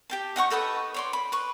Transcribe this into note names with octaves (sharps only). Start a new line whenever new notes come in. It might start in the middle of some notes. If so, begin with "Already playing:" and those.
G4 G5 A5
D#4 F#5 G5 C#6
D#4 A4 B4 D#6
C#5 D5 C6
B5
B4 C#6